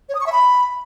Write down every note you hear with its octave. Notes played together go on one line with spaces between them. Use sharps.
C#5
D#6
C#6
E5
B5